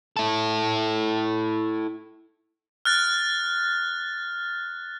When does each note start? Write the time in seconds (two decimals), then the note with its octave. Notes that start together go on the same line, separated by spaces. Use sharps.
0.17 E4 A4
2.85 F6 F#6 A6